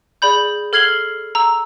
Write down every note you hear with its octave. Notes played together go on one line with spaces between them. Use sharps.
G#4 D5 B5 G6
A4 F6 G#6 C7 F#7 G7
A#5 E6